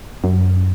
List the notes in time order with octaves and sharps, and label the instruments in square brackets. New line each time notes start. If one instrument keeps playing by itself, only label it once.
[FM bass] F#2